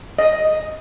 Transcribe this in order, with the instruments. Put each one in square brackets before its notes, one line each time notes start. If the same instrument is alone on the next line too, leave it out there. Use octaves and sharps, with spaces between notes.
[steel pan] D#5